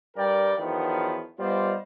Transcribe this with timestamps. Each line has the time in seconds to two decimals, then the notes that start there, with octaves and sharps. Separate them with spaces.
0.17 G2 G3 A#4 D5 G5
0.59 E2 D#3 F3 F#3 B3
1.39 G3 B3 F4 C5 D5 D#5